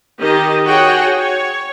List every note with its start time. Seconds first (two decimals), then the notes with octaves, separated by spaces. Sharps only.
0.19 D#3 G4 D#5
0.66 F#4 G#4 C#5 F#5 G5
1.18 C#5